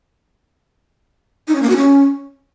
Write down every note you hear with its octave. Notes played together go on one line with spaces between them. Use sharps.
D#4
C#4
A#3
F#4
C#4